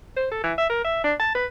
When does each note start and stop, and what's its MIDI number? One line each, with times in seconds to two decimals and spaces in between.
0.16 0.31 72
0.31 0.42 69
0.44 0.53 52
0.58 0.69 76
0.70 0.81 70
0.84 1.01 76
1.04 1.14 62
1.19 1.30 81
1.35 1.46 71